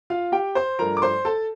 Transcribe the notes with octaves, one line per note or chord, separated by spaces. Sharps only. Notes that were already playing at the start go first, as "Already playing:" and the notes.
F4 F5
G4 G5
C5 C6
G2 F3 A3 A#4 A#5
D6
C5 C6
A4 A5